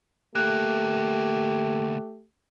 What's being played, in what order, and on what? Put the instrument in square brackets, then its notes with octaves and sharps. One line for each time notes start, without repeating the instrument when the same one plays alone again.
[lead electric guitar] D2 A#3 [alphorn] A3 [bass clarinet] G4 [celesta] F#6